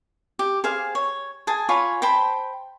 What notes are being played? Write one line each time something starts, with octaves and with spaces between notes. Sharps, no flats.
G4
G#4 C5 F5
C#5
G#4 G#5 A5
F4 C#5 G#5 B5
C5 G5 A5 B5